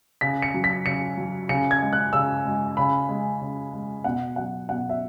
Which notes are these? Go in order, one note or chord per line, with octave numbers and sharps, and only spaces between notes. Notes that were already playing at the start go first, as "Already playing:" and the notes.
C#3 B6
C#7
F#3
B6
C#3 C#7
F#3
C#3 C#7
G#6
G#3
F#6
C#3 E6
G#3
C#3 B5
G#3
C#3
G#3
B2 F#5
F#3 F#5
B2 F#5
E5